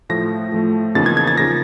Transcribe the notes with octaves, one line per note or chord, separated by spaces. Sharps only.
A2 F3 A3 A#6
A2 F3 A3
E2 C#3 F3 A#3 D#4 A6
G#6
G#6
A6
C#3 F3 A#3 D#4 A#6